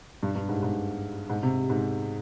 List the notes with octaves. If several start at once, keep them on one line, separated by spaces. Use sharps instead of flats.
G2
G2
G#2
G#2
G#2
C3
G#2